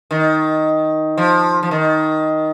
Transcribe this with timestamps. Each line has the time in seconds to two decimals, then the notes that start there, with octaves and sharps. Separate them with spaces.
0.11 D#3
1.18 F3
1.63 F3
1.71 D#3